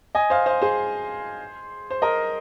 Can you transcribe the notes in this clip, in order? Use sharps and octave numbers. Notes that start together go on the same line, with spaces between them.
D#5 G#5
C5 F5
C5 F5
G#4 C5
C5
A#4 D#5